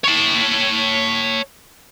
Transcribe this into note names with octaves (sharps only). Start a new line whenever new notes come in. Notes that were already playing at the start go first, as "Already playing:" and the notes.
C#5 A5